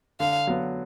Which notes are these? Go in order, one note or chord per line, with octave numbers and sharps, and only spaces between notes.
D3 F5
F#3 B3